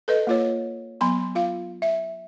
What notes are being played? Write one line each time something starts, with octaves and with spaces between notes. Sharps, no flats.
A4 B4 D#5
A#3 F4 C#5
F#3 B3 B5 C6
F4 F5
E5